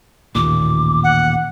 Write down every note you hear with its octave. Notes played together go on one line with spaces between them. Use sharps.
A1 D#2 A#2 D6
F#5